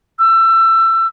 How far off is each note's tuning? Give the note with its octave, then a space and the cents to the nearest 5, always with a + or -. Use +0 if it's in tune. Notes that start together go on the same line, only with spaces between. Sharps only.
E6 +25